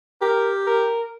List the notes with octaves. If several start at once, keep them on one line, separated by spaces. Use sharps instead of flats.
G4 A#4
A#4